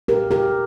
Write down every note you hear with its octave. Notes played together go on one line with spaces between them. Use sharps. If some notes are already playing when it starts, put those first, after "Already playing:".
A#2 G4 A#4
G4 A#4